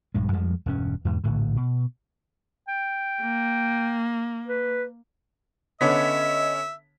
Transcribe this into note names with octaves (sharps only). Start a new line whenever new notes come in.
A#1 G2 G#3
F2 F3 G3 G#3
E1 G2 C#4
E2 G#2 B2
D1 A#1 A2 D3
B2
G5
A#3
B4
D3 B3 C#4 C#5 D#5 E5 B6